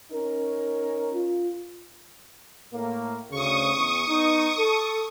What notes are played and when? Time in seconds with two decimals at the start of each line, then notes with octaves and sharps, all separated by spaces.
0.11 C#4 D#4 A#4
1.15 F4
2.73 A2 A#3
3.31 D2 C#3 C#6 D#6
3.74 E2
4.08 B3 D#4
4.58 A4